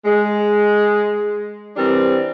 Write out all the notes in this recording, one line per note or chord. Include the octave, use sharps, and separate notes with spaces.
G#3
E3 G3 C4 D4 A#4